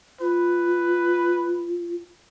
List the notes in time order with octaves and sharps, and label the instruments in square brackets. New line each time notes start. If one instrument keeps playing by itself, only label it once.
[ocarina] F4 [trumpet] B4